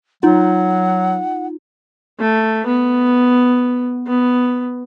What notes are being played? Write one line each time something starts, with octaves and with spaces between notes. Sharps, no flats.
F#3 D#4 F4 F#5
A3
B3
B3